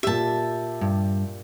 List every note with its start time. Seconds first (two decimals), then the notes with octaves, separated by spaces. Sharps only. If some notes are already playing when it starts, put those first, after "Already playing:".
0.03 A#2 G4 E5 A5
0.81 G2